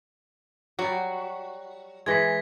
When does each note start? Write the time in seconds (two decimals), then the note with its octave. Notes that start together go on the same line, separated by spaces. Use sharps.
0.79 F#3 G3 F#4
2.06 E3 G#3 G#6 A#6 B6